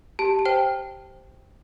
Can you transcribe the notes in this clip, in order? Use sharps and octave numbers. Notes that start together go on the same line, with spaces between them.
G4 A5
A5
C5 G5